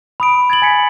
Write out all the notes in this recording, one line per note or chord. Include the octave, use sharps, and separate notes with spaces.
B5 D#6 D7
D#6
G#6 A6 D7 F#7
G#5 G#6 B6 C#7 D7